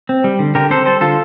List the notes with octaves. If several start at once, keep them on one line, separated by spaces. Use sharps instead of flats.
C4
G3
D3
D3 G4 A#4
C4 A4 C5
G3 A4 C5
D3 F4 A4